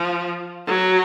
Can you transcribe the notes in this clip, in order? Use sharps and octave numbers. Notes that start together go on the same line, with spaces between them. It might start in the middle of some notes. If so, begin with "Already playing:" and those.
Already playing: F3
F#3